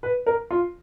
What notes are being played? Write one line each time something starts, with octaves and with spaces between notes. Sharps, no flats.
B4
A#4
F4